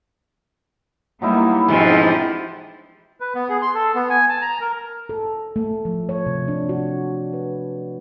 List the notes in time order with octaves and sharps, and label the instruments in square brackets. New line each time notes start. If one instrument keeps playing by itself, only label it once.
[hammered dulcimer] F#3 D#4 E4 [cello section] G3 A#3 B3
[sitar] G#2 B2 F3 [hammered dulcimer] E3 C4 [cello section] D4 D#4 G4
[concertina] B4
B3
G#4
C6
A4
B3
G#5
A5
A#5
A#4
[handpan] A4
A3
F3
C#5
C3
D4
F#4
B4